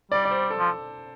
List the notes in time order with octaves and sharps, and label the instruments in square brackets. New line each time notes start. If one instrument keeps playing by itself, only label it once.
[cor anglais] G3 [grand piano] D5
[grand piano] D5
C5
A4
[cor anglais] F3